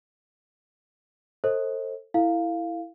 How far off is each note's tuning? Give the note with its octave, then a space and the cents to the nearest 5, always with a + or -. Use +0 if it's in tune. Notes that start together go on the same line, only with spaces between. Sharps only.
A4 +30 C5 +30 D#5 +30
E4 +0 A4 +25 F5 +0